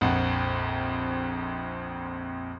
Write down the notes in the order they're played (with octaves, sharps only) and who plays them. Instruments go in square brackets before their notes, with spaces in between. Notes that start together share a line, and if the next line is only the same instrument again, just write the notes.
[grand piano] A#1 F2 F#5